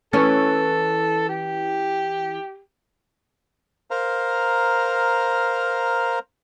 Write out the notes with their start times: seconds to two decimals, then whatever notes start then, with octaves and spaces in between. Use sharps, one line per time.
0.13 E3 C#4 A4
1.29 G4
3.91 A#4 C5 F5 A#5